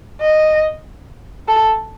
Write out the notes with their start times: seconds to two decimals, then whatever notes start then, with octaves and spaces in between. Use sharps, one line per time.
0.21 D#5
1.48 A4